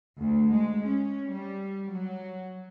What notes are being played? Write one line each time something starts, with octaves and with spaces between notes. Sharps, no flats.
D2
G#3
C#4
G3
F#3